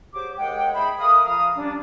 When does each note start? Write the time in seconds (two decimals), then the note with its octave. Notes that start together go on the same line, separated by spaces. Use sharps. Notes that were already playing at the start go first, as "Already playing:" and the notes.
0.14 F#3 G4 G#4 C5 D6
0.38 D#2 G#3 G#4 F#5 G5
0.75 D#4 G#4 C5 E5 B5
0.99 A3 A#4 F5 B5 D#6
1.25 F3 F5 A#5 D#6
1.56 G3 C#4 D4